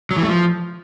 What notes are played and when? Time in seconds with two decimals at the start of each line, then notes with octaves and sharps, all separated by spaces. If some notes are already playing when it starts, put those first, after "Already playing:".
0.11 F#3
0.16 E3
0.22 A3
0.28 F3